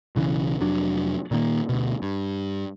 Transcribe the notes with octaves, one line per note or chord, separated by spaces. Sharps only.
B1 C#3 E3
F1 F#3 D4
A#2 D#3 A#3
D2 B2
G2